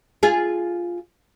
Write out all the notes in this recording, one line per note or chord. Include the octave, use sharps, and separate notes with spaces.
F4 G#4